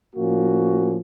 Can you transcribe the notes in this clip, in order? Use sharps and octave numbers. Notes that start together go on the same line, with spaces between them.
A2 F3 A#3 C#4 F#4